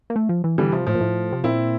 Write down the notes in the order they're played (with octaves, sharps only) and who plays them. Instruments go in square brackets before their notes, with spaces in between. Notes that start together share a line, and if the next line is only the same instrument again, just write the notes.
[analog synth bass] A#3
A3
F3
E3
[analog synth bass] D3 [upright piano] E3 G3
[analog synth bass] C3 [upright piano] F3
[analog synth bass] A2 [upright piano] F3
[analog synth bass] A#2
A2
C3
[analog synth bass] A#2 [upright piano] C4 E4